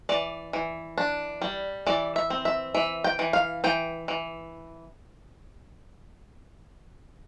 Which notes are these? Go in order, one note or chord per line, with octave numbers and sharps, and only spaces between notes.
E3 D5
E3
D4
G3
E3 D5
E5
C4
E5
E3 E5
G5
E3
F5
E3 G5
E3